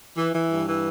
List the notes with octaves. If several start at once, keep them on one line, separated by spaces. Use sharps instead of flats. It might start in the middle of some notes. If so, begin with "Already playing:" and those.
E3
E3
G2
E3